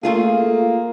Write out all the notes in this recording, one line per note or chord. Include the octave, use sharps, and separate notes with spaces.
A3 A#3 F4 G#4